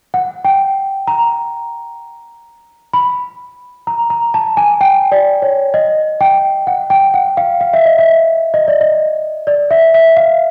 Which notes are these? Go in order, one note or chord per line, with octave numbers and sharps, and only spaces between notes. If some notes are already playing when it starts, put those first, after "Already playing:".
F#5
G5
A#5
B5
A#5
A#5
A5
G#5
G5
D5
C#5
D#5
G5
F#5
G5
F#5
F5
F5
E5
D#5
E5
D#5
D5
D#5
D5
E5
E5
F5